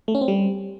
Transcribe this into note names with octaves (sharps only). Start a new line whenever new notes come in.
A3
C#4
C4
G3